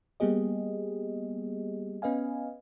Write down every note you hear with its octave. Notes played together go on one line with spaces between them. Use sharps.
G3 A#3 B3 G4 G#4 D#5
B3 C#4 B4 D#5 F5 G#5